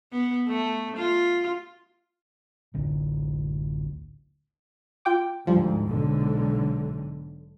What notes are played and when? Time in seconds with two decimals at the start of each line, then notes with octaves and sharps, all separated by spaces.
0.12 B3
0.48 A3
0.97 F4
2.74 D1 A1 D2
5.05 F4 G5 D6
5.47 D2 G#2 F3 G3
5.87 B1 G#2 D3